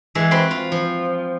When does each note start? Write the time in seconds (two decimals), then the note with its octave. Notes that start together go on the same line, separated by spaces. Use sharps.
0.15 E3 G#3 E5
0.31 C4 F#4 B4 C6
0.51 F4
0.72 F3